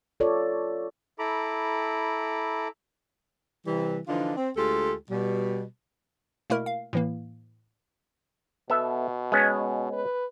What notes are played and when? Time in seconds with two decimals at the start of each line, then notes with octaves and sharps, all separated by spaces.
0.20 F4 A4 C#5 D5
1.19 E4 A4 A#5 B5 D6
3.66 C3 E3 G3
4.08 D3 E3 F3 D4 D#4 F4
4.37 C4
4.57 D2 G#3 F4 G4 A4
5.10 B2 G3
6.50 B2 A3 A#3 E4 A#4
6.66 F5
6.93 A2 E3 A#3
8.70 B2 B3 A4 E5
9.32 G#3 B3 C#4
9.92 B4